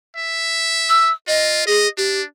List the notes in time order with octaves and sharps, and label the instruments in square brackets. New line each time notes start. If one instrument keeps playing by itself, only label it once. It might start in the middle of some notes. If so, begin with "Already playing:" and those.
[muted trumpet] E5
[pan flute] E6
[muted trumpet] F4 [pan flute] D#5
[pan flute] G#4 [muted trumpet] D#5
[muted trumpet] D4 [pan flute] G4